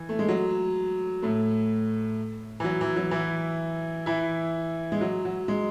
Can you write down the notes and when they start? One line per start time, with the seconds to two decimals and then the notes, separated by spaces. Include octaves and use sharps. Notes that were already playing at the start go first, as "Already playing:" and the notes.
Already playing: E3
0.09 A3
0.19 G#3
0.28 F#3
1.22 A2 A3
2.60 E3
2.64 F#3
2.81 E3
2.96 F#3
3.11 E3 E4
4.06 E3 E4
4.92 G#3
5.01 F#3
5.25 F#3
5.48 G#3